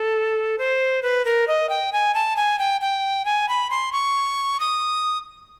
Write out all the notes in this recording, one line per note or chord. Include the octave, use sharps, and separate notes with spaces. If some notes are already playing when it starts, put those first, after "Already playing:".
Already playing: A4
C5
B4
A#4
D#5
G5
G#5
A5
G#5
G5
G5
G#5
B5
C6
C#6
D#6